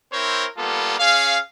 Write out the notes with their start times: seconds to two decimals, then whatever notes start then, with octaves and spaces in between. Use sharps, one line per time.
0.13 C4 E4 A#4 C5 C#5
0.58 G3 A#3 B3 F4 A4
0.99 C#4 G#4 F5